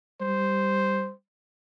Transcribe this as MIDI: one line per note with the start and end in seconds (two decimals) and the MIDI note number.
0.21 1.09 55
0.21 1.13 72